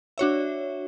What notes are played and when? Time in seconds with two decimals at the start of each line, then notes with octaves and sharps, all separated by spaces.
0.18 D4 F#4 C#5 E5